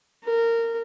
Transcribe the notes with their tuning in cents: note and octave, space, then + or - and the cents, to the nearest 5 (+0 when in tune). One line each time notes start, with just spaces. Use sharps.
A#4 -20